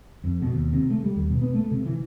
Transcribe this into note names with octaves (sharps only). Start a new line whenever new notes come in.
F2
B2
D#2
C3
A3
G3
D#2
B2
B3
A3
C3
E3